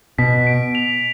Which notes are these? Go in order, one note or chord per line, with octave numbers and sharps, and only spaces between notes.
B2 B6
D7
F7